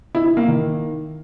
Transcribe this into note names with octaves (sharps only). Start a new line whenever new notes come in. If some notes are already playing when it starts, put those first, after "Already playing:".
E4
E4
A#3
D#3